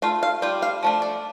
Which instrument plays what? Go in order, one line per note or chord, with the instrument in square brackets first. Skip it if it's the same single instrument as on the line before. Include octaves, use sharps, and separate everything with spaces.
[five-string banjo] A3 F4 F5
F5
G3 F4 G5
F5
F3 A3 D4
D5